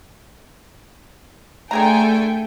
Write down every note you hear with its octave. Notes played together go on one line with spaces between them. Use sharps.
D3 A3 G#4 A4 G5 G#5 A#5